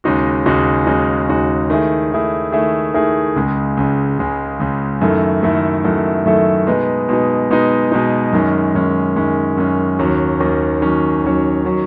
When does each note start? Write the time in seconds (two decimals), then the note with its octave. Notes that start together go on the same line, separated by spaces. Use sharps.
0.04 D#2 C#3 G#3 D#4 F#4
0.46 D#2 C#3 G#3 D#4 F#4
0.86 D#2 C#3 G#3 D#4 F#4
1.28 D#2 C#3 G#3 D#4 F#4
1.70 D#3 A3 E4 G#4
2.11 D#3 A3 E4 G#4
2.52 D#3 A3 E4 G#4
2.94 D#3 A3 E4 G#4
3.36 C#2 C#3 G#3
3.77 C#2 C#3 G#3
4.18 C#2 C#3 G#3
4.60 C#2 C#3 G#3
5.01 F#2 D#3 A3 E4 A4
5.43 F#2 D#3 A3 E4 A4
5.85 F#2 D#3 A3 E4 A4
6.26 F#2 D#3 A3 E4 A4
6.67 B2 G#3 B3 D#4
7.09 B2 G#3 B3 D#4
7.50 B2 G#3 B3 D#4
7.92 B2 G#3 B3 D#4
8.33 F#2 D#3 G#3 C#4
8.75 F#2 D#3 G#3 C#4
9.16 F#2 D#3 G#3 C#4
9.57 F#2 D#3 G#3 C#4
9.99 D#2 D#3 F#3 C#4
10.40 D#2 D#3 F#3 C#4
10.81 D#2 D#3 F#3 C#4
11.23 D#2 D#3 F#3 C#4
11.65 D#3 F#3 C#4